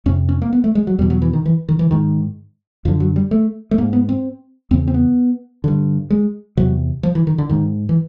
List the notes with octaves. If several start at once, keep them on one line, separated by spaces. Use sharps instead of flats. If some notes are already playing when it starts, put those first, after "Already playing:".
F2 C3 C#4
C#4
A#3
B3
A3
G#3
F#3
E2 B2 G3
F#3
E3
D#3
E3
D#3
E3
G#2 D#3
F#2 D3 F3
F#3
G3
A3
A3
G#2 A#3
B3
C4
E2 C#3 C4
C4
B3
G2 D3
G#3
E2 C3 F#3
F3
E3
D#3
D3
G#2 D#3
E3